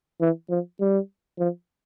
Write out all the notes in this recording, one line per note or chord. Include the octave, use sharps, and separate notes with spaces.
E3
F3
G3
F3